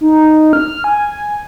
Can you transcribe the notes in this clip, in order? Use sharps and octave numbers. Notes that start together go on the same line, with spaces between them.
D#4
F6
G#5